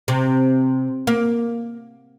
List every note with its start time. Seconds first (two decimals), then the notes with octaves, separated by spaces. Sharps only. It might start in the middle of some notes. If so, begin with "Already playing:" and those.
0.08 C3
1.07 A#3